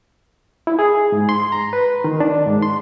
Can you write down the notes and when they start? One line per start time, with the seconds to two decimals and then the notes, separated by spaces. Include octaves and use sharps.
0.67 E4
0.79 G#4
1.12 G#2
1.29 C6
1.52 A#5
1.73 B4
2.04 D#3
2.20 D4
2.46 G#2
2.63 C6